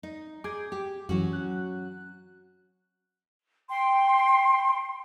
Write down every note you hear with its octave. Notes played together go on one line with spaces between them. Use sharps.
D#4
G#4 D6 G6 G#6
G4
F#2 E3 F#3 C#4 F#4
F#6
G5 C6